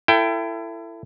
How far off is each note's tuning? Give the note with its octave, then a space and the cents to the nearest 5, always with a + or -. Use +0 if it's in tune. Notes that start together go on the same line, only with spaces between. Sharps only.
E4 +25 A4 +30 G5 +0